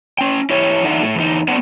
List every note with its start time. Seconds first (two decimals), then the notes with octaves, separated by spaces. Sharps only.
0.18 C#4 G5
0.50 E4 G4 C#5
0.83 E2 D4 D#4 A4 E5 F#5
1.03 A2 A3
1.16 E2 D#4
1.48 B3 C#4 D4 C5 F#5